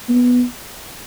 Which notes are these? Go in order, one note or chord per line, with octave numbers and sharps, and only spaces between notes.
B3